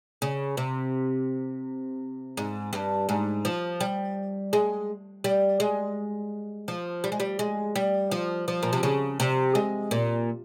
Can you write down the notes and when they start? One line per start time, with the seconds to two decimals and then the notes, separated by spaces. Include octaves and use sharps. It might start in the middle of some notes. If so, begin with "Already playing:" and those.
0.22 C#3
0.57 C3
2.37 G#2
2.73 G2
3.09 G#2
3.45 F3
3.80 G3
4.53 G#3
5.24 G3
5.60 G#3
6.68 F3
7.04 G3
7.12 G#3
7.20 G3
7.39 G#3
7.75 G3
8.11 F3
8.48 F3
8.63 A#2
8.73 C3
8.83 C#3
9.20 C3
9.55 G#3
9.91 A#2